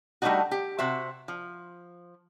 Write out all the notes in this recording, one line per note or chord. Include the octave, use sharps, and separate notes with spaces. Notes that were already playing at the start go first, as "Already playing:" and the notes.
G3 A3 C4 D4 D#4 F#4
G4
C3 F#4 C5 E5
F3